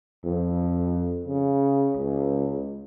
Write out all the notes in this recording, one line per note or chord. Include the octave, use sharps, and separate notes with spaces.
F2
C#3
C#2